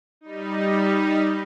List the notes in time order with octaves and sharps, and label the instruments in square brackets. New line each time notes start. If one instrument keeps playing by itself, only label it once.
[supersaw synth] G3 D#4